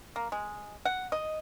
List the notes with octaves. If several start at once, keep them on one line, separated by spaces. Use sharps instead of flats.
A#3
G#3
F#5
D#5